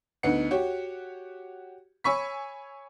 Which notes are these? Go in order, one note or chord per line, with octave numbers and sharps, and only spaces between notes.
D2 B3 D#4 F#5 C#7
F#4 G4 C#5
C#5 G#5 B5 C#6 E6 B6